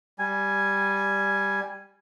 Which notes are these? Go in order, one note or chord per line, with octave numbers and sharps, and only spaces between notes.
G3 G#5